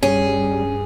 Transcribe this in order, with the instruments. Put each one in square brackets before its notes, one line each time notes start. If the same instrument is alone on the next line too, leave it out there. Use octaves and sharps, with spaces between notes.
[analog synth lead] G2 [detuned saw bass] G3 [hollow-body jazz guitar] C#4 [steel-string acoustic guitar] G#4